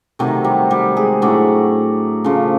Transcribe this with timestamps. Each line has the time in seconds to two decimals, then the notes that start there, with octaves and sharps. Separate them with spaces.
0.19 C3 D#3 F#3 A3
0.44 G3 G4
0.70 G3 G4
0.96 G#3 G#4
1.22 A2 F#3 A3 D4 D5
2.24 C#3 F3 A3